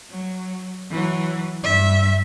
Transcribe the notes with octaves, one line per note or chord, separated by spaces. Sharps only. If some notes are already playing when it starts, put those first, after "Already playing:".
F#3
E3 F#3
G2 E5